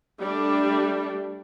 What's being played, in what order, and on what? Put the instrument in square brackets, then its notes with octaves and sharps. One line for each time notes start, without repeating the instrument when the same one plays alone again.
[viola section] G3 A3 D4